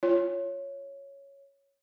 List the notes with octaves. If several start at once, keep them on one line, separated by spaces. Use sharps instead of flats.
F4 C#5